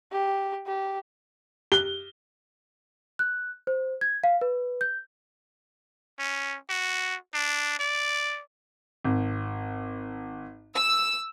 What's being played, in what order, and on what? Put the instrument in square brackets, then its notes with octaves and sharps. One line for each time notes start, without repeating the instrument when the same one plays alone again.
[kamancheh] G4
G4
[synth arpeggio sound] G4 F#6 [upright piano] G7
[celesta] F#6
C5
G#6
F5
B4
G6
[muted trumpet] C#4
F#4
D4
D5
[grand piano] G#1
[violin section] E6